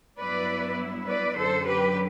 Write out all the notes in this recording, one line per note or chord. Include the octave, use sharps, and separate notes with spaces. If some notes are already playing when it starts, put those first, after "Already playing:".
G2 F#3 B3 E4 B4 D5
B4 D5
F#2 D3 F#3 A4 C5
G4 B4